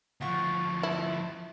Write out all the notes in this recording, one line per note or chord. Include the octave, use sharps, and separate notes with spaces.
D2 F3 F4 F#5 C#6
E4